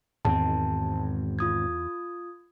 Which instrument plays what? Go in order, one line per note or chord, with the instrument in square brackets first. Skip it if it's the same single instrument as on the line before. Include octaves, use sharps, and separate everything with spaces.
[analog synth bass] E2 [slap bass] G#2 D#3 C4 [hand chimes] A5
[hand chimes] F4 D#6 G#6